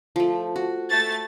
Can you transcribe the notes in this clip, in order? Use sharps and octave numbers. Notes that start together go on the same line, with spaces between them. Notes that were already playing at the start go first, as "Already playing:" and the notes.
F3 A3
F#4
A3 A6